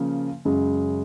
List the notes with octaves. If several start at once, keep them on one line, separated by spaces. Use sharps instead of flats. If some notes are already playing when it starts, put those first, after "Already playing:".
Already playing: C#3 F3 A#3
F#2 C#3 G#3